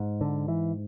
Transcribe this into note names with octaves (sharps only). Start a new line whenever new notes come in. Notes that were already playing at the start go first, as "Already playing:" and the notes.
Already playing: G#2
D3
E3